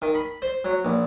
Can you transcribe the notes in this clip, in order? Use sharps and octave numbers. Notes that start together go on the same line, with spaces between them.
D#3
B5
C5
F#3
A#1